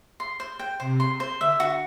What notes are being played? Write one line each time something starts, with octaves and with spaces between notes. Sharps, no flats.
C6
C5
G5
C3 C5
C6
C5
D3 E5
F#4